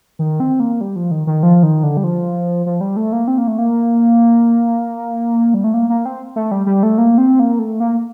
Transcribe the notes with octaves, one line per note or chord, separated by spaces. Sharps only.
D#3
C4
A#3
G3
F3
D#3
D#3
F3
D#3
D3
G3
F3
F3
G3
A3
A#3
C4
A#3
A3
A#3
G3
A3
A#3
A#3
C4
A3
G3
G3
A3
A#3
C4
A#3
A3
A#3